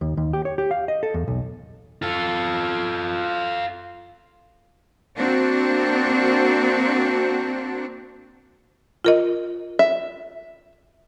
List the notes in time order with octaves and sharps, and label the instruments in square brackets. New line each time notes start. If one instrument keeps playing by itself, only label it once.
[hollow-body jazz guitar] D#2
D#2
G4
C#5
G4
F5
D#5
A4
E2
B1
[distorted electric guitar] F4 A4
[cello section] A#3 C4 D4 F#4
[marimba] F4 A#4 D#5
[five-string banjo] E5